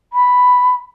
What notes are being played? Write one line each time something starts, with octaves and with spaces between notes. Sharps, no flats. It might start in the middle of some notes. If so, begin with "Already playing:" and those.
B5